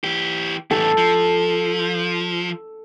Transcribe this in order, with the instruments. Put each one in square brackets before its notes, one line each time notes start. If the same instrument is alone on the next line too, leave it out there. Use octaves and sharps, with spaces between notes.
[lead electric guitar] E3 G4
[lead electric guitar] E2 A2 [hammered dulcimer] A4
[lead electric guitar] F3